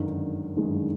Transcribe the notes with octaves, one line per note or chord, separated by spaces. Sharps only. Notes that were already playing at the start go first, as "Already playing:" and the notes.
Already playing: G1 F#2 D#3 G#3
G1 F#2 D#3 G#3